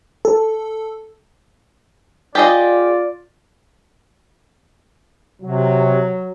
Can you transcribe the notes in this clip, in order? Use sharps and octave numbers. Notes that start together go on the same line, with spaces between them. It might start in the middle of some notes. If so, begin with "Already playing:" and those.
A4
F4 G4 G#4 D5 D#5
C3 F#3